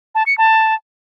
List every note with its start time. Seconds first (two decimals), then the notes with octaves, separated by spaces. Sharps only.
0.15 A5
0.26 C#7
0.38 A5